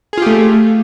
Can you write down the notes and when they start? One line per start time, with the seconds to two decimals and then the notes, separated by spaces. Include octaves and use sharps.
0.13 G#4
0.18 F4
0.22 G4
0.27 A3